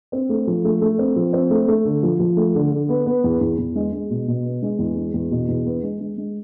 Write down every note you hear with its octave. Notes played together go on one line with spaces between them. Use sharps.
C4
A3
F3
A3
A3
C4
F3
C4
A3
A3
D3
F3
F3
A3
D3
D3
B3
B3
E2
E2
E2
G#3
G#3
B2
B2
B3
G#3
E2
G#3
E2
B2
E2
B3
G#3
G#3
G#3